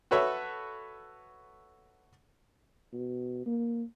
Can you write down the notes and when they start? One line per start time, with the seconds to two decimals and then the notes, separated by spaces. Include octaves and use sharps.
0.11 F#4 A4 B4 C#5 E5
2.93 B2
3.46 A#3